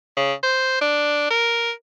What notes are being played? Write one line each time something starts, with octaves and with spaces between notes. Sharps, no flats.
C#3
C5
D4
A#4